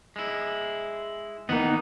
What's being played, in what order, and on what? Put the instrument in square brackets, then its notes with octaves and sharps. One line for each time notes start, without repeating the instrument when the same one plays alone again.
[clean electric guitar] G#3 E4
[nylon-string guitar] D#3 E3 A#3 [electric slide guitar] B3 D#4 [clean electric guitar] D#5 F#5